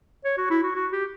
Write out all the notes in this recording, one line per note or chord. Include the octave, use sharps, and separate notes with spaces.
C#5
F#4
E4
F#4
F#4
G4